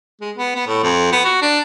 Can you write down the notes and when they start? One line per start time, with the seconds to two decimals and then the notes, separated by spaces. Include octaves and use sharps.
0.21 G#3
0.37 B3
0.56 B3
0.67 A2
0.83 F2
1.12 B3
1.25 F#4
1.42 D4